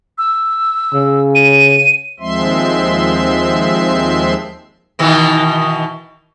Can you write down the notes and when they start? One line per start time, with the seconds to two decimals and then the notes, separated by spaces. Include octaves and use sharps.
0.18 E6
0.94 C#3
1.35 D#7
2.20 D#2 F3 G#3 C4 E5 C6
4.99 B2 D#3 E3